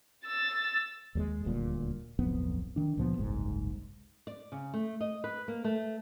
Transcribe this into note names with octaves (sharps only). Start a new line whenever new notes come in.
E6 A6
D#2 G3 G#3
D#1 D2 A#2 G3
D1 B1 F2 B3
D#3 D4
C#2 A#2 F3 B3
F#1 C2 G#2
D5
C#3
A3
D#5
B4
A#3
A3